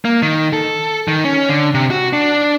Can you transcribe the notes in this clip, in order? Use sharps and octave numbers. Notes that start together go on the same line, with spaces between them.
A#3
D#3
A4
D#3
C#4
D3
C3
F#4
D4